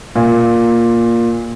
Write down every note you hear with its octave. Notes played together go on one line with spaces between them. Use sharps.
A#2